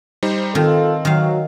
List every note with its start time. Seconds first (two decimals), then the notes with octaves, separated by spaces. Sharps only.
0.23 G3 D#4 C5
0.55 D#3 C4 F4 A4
1.05 D#3 F#3 F5